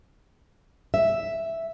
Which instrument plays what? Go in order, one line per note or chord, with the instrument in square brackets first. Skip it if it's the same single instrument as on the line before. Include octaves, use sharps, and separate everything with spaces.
[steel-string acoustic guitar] E5